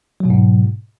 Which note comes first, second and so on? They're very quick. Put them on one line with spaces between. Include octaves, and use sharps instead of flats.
F#3 B2 G#2